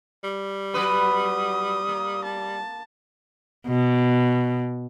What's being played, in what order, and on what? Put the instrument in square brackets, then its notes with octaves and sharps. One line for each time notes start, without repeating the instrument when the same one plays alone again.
[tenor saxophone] G3
[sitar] F#3 F#4 B4 [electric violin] D#6
[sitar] A#3
[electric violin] A5
[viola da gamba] B2